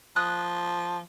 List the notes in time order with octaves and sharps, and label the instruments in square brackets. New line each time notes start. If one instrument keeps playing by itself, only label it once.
[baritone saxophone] F3 [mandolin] D#6 F#6